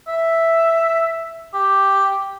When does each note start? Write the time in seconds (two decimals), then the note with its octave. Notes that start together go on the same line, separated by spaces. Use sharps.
0.08 E5
1.54 G4